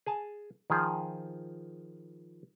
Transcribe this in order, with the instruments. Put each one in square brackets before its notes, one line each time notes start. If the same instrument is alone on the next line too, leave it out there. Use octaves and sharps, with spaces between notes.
[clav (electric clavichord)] G#4 G#5 A5
D#3 F3 G#4